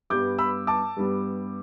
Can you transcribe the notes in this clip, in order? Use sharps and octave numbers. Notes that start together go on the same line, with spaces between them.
G2 G3 B3 D6 G6
B5 E6
A5 D6
G2 G3 B3